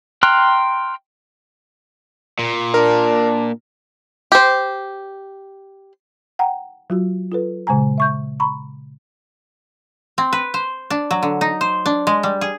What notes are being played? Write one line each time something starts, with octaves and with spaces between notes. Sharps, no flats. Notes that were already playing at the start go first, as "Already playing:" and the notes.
G5 A#5 C6 F6 F#6
A#2
D4 A#4
G4 C5
F#5 G5 A#5
F#3 F4 F#4
F4 A4 B4
A#2 C#3 G#3 G#5 A#5
E5 C#6 G6
A#5 B5 C#6
C4
B4
C5
D4
F#3
D3
D#4
C5
D4
G#3
G3
G#4